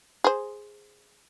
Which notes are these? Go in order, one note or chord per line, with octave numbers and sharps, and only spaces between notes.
G#4 C5